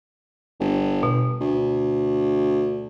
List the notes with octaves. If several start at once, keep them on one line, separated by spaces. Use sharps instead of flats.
G1
B2
D2